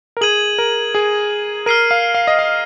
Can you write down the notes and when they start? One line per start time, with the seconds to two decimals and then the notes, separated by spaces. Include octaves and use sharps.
0.17 A#4
0.21 G#4 G#6 D#7 F#7
0.58 A#4
0.95 G#4
1.66 A#4 F6 C7 D#7
1.91 F5
2.15 F5
2.27 D#5
2.39 F5